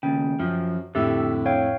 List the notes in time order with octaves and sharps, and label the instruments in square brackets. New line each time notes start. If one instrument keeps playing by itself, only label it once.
[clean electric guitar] D#2 C#3 [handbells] G5
[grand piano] F#2 [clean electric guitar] F3
[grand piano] F2 A2 E4 [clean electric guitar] D3 [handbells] G4 E5 E6
[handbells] C#5 F5 G5